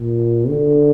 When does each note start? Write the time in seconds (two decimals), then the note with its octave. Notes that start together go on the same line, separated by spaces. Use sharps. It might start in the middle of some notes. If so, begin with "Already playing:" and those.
Already playing: A#2
0.49 D3